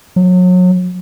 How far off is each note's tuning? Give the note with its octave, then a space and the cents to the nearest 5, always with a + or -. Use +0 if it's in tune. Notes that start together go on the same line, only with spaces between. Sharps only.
F#3 -30